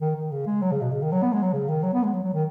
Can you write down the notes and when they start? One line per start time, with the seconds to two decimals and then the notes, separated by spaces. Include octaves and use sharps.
0.01 D#3
0.16 D#3
0.31 C#3
0.46 G#3
0.62 F#3
0.71 C#3
0.81 B2
0.92 C#3
1.02 D#3
1.12 F#3
1.22 B3
1.32 G#3
1.42 F#3
1.53 C#3
1.68 D#3
1.83 F#3
1.93 B3
2.03 G#3
2.13 F#3
2.23 F#3
2.34 D#3